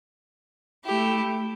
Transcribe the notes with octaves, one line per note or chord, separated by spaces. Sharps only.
A3 E4 G4